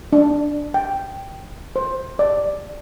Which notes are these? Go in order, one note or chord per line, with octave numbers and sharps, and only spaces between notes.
D4
G5
C5
D5